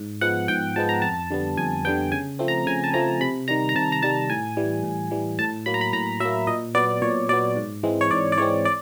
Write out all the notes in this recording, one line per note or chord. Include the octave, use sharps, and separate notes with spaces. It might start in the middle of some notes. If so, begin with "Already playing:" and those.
Already playing: G#2
F3 G#3 B3 F#5
G#2 G5
F3 G#3 B3 A5
A#5
F2 A5
D3 G3 B3
F2 G#5
D3 G3 B3 G5
C#3 G#5
F3 A3 C4
A#5
C#3 G#5
A5
F3 A3 C4 A#5
C3 B5
D#3 G3 A#5
A#5
C3 A5
A#5
D#3 G3 A5
A2 G#5
E3 G3
A2
E3 G3
A2 A5
F#3 A#3 B5
A#5
B5
A2 A#5
F#3 A#3 E5
A#2 D#5
F#3 B3 D5
A#2 C#5
F#3 B3 D5
G#2
E3 G#3 C4
C#5
G#2 D5
D5
E3 G#3 C4 C#5
D5